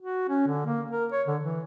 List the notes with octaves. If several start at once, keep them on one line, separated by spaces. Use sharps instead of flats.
F#4
C#4
D3
A#3
A#4
C#5
D3
E3